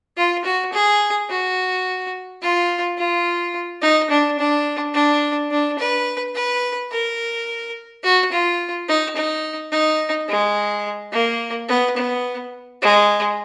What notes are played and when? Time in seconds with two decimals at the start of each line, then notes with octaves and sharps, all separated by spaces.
0.17 F4
0.45 F#4
0.73 G#4
1.30 F#4
2.42 F4
2.98 F4
3.82 D#4
4.10 D4
4.39 D4
4.94 D4
5.51 D4
5.79 B4
6.35 B4
6.92 A#4
8.03 F#4
8.31 F4
8.88 D#4
9.16 D#4
9.72 D#4
10.29 G#3
11.13 A#3
11.69 B3
11.97 B3
12.82 G#3